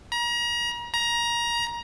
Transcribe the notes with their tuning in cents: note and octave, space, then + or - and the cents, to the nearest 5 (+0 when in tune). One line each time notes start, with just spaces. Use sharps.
A#5 +35
A#5 +20